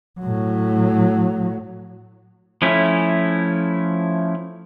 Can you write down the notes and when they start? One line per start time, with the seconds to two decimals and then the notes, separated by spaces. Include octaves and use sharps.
0.20 A2 F#3
2.62 F3 A3 C#4 E4